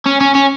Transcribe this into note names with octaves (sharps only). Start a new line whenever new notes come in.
C#4
C#4
C#4